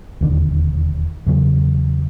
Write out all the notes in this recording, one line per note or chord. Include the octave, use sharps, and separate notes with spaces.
E1 D#2 D3
E2 C#3 F#3